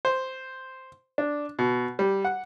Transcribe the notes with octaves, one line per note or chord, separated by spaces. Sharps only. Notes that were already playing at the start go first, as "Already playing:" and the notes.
C5
D4
B2
G3
F#5